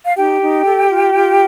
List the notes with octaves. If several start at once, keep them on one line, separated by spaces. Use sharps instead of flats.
F5
D#4 G4 G5
D#4
A4
F4
F4